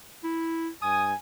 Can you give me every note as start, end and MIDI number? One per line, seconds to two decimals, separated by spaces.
0.24 0.69 64
0.82 1.15 43
0.82 1.15 80
0.82 1.08 87